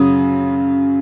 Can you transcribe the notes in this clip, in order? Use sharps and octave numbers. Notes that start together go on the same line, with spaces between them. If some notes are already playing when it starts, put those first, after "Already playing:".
Already playing: F#2 C#3 F#3 D#6